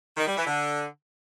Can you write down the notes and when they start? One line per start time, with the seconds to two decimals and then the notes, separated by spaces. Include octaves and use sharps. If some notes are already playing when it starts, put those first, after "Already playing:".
0.17 D#3
0.27 G3
0.37 E3
0.47 D3